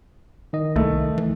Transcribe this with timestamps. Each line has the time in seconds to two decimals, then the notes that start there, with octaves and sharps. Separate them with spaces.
0.53 D#3 D#5
0.76 C2 A3
1.18 E3